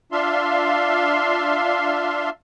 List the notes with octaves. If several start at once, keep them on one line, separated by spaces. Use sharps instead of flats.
D4 F4 E5 F5 C6